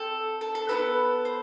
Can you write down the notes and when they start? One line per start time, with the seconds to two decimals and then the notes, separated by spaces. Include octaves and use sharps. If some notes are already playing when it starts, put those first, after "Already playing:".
Already playing: C4 A4
0.41 A4
0.55 A4
0.69 B3 E4 A4 B4
1.25 C5